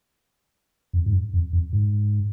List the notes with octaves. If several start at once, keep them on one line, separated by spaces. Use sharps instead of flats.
F2
G#2
F#2
F2
F2
G#2